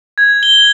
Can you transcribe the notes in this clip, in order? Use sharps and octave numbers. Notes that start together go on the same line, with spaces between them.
G#6
G7